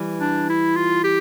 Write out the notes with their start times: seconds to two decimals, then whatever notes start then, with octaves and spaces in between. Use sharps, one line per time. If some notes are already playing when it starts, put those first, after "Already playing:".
Already playing: E3 G3
0.20 D4
0.49 E4
0.76 F4
1.04 G4